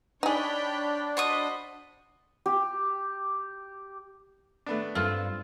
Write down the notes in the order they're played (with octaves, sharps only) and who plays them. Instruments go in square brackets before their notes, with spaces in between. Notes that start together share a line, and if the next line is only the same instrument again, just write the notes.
[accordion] D4 [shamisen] D#4 G#4 [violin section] C#5 G5 B5
[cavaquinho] F#4 C#6 D#6 [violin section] C5 D#5 B5
[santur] G4
[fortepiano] A3 B3 D4
[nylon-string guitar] G2 [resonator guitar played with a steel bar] C4 F4 A4